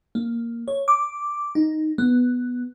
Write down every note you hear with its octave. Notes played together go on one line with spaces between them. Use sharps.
A#3
C#5
D6
D#4
B3